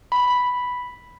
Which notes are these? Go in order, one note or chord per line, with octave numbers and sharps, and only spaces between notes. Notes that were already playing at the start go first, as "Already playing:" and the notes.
B5